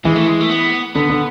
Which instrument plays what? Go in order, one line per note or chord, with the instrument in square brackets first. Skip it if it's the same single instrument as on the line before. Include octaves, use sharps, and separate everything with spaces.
[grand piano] E3 [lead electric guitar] G#3
[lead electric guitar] A3
G#3
A3
B3
[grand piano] D3 [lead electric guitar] B3
[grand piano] D3